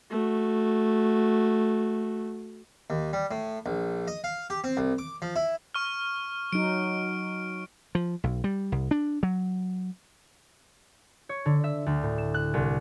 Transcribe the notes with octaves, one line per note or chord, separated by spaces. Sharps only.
A3 F#4
D#2
G3
A2
A#1
D#5
F5
G4
C4
C2
D6
F3
E4
C#6 F6
F#3 D#4 D7
F3
B1
G3
C2
D4
F#3
C#5
D3
E5
D2
A2
E7
F#6
C2